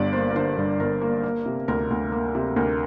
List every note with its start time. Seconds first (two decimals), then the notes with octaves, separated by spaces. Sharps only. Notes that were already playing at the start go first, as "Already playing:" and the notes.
Already playing: G1 G2 D3 D5
0.13 A#3 C5
0.31 A#4
0.36 D3 C5
0.58 G2
0.80 G1 A#4
1.01 A#3
1.23 A#3
1.46 C3
1.68 D2 A#4
1.90 D2
2.12 A#3
2.35 C3
2.56 D2 A#4